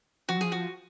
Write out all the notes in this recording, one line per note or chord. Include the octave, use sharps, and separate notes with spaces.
F3 F#4
F#3
F3 G#4
F#4